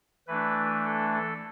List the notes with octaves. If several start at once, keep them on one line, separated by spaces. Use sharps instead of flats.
E3 A3 D4 B4
A4
A4